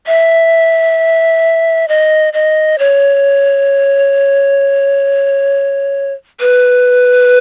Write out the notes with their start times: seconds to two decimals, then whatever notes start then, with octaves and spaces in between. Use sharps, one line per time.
0.07 E5
1.88 D#5
2.33 D#5
2.79 C#5
6.40 B4